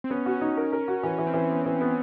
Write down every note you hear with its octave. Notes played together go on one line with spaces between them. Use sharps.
C4
B3 C#4
F#4
D#4
A#4
A#4
F#4
E3 C#4
E3
C4
E3
B3
E3
B3